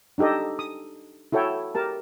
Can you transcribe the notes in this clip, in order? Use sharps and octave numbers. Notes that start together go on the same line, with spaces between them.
D4 D#4 G4 A4 D#5
D#6
E4 F#4 A4 C#5 G5
G4 A#4 A5